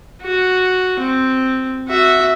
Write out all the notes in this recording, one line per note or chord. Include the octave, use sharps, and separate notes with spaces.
F#4
C4
F#4 E5